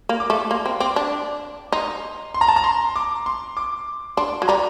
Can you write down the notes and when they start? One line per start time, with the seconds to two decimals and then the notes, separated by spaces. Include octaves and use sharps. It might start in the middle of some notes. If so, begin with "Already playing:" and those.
0.09 A#3
0.20 D6
0.30 A3
0.50 A#3 C6
0.66 C4
0.80 C4 D6
0.96 D4
1.72 D#4 C6
2.34 C6
2.41 A#5
2.48 A5
2.56 A#5
2.64 C6
2.96 D6
3.26 C6
3.57 D6
4.17 D4 C6
4.42 F#3
4.48 G3 A#5